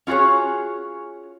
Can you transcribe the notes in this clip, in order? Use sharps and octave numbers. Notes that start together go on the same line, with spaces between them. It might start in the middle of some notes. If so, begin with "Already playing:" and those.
C#4 F4 F#4 G#4 C#5